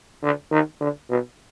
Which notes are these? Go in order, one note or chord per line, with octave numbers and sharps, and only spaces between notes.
D3
D#3
D3
B2